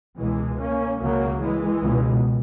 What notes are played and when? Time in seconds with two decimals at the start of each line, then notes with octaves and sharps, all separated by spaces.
0.17 C#2 B2 E3 G#3
0.59 A#3 C#4
1.00 C#2 C#3 F#3 A#3
1.40 E3 G#3
1.82 C#2 B2